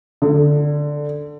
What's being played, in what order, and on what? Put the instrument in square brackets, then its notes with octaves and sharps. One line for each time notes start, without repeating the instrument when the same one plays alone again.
[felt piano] D3